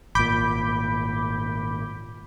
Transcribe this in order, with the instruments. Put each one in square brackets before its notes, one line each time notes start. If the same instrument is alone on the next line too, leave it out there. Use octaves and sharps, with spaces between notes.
[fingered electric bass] G#1 A#2 [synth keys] B5 D6 G6